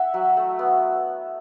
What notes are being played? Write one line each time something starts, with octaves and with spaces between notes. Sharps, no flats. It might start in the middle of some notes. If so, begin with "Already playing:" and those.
Already playing: E4 E5 F#5
F#3
A3
B3